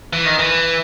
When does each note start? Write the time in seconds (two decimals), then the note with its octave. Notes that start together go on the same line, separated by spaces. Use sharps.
0.13 E3
0.25 D#3
0.39 E3